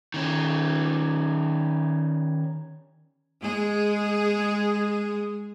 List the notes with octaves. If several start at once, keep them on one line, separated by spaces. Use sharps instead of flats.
D#3 C#4
G#3 G#4